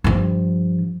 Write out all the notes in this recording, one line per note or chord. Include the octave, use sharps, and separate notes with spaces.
G2 F3